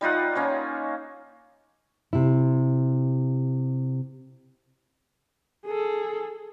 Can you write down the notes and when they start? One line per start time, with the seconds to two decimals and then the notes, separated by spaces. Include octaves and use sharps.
0.01 G3 D#4 F4 F#5
0.35 A#3 C#4 C#5
2.13 C3 E4
5.67 G#4 A4